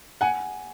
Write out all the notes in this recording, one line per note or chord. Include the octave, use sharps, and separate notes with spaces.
F#5 G#5